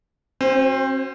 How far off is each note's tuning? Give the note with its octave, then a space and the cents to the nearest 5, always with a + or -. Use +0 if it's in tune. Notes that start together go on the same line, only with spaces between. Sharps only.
C4 +40 F#4 +0 C5 +0